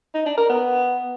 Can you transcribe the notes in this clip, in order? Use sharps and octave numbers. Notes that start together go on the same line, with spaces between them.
D#4
D4
A#4
B3